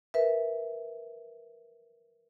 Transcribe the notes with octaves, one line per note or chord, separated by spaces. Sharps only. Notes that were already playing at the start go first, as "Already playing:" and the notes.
A#4 B4 E5